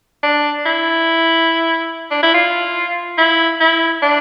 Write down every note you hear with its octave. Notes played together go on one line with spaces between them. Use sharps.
D4
E4
D4
E4
F4
E4
E4
D4